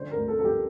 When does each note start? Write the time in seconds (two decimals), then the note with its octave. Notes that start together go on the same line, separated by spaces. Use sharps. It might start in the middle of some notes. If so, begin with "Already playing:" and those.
Already playing: D3 F3 C5
0.11 A#4
0.17 D2
0.28 A4
0.39 F3 A4
0.45 G4